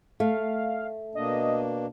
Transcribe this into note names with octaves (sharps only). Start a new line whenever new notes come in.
A3 F5
B2 A#3 D4 D#5